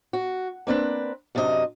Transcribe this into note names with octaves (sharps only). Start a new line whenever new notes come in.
F#4
A#3 C4 D4 B4
F#2 C3 D4 F#4 D#5